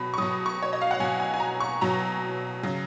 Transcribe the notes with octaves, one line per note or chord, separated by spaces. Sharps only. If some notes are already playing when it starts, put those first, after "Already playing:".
Already playing: B2 F#3 B5
C#6
B2 F#3 D#6
C#6
C#5
D#5
F5
F#5
B2 F#3 G#5
G#5
G#5
A#5
C#6
B2 F#3 A#5
C#3 F#3